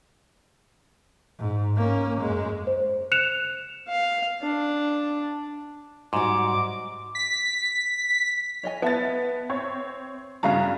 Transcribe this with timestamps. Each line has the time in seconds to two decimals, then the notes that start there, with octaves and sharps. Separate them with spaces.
1.39 G#2
1.77 A#3 C#4
2.22 F#2 G#3
2.67 C5
3.12 F#6 C#7 E7 F7
3.88 F5
4.42 D4
6.13 G#2 F#3 G3 F#4 D6
7.15 B6
8.63 C#5 D#5 G#5
8.82 B3 E5 A5 A6
9.49 C4 C#5
10.43 G2 C#3 F#4 G#4 F5 A#5